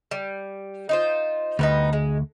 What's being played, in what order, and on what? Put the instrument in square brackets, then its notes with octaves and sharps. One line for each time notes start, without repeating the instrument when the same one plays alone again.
[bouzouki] G3
D#4 F4 C5
[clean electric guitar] D2 [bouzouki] G3 B3 D#4
[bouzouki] G#3